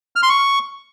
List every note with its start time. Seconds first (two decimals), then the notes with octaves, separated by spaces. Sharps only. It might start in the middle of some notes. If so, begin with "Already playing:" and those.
0.16 F6
0.23 C6
0.30 C#6